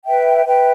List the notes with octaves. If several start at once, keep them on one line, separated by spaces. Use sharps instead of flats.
B4 E5 G5
B4 E5 G5